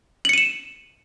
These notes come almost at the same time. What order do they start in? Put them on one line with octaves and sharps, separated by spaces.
F#7 C#7 D#7 E7